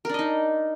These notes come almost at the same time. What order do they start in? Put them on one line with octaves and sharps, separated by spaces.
A#4 D4 D#5 D#4